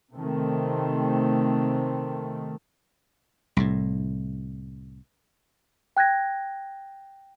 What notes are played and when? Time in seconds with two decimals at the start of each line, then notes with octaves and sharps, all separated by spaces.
0.15 C3 D#3 A3 C4
3.57 C2 A2
5.97 G5 F#6 G#6 A#6